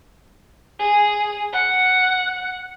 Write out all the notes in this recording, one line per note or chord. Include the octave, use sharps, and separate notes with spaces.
G#4
F#5